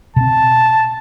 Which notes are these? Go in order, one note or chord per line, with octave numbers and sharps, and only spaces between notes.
B2 C4 A5